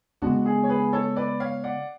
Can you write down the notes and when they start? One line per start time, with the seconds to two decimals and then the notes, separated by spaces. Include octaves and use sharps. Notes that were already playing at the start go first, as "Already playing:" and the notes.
0.22 C#3 G#3 B3 D4 F#4
0.45 G#4
0.63 C#5
0.69 G#4 B4
0.93 A4 C#5
1.16 B4 D5
1.40 C#5 F5
1.64 D5 F#5